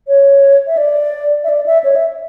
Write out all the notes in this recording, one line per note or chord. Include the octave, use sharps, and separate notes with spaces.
C#5
E5
D5
E5
D5
E5
C#5
E5